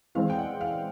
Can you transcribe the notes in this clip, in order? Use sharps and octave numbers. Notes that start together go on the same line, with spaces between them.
E3 G#3 C4 F5
G5
F#5
F5